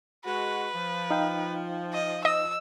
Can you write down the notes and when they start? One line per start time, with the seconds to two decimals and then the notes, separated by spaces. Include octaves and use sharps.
0.25 G#3 F#4 B4
0.75 F3
1.11 D#4 F5 G5
1.93 D#5
2.25 D#5 E6